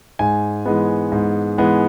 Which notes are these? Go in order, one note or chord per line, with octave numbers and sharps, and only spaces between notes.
G#2 G#5
E3 G#3 B3
G#2
E3 G#3 B3